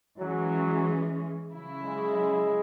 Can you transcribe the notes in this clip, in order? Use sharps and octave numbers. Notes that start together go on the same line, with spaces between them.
E3 F#3 G#3 C#4
C#3 F#3 E4
G#3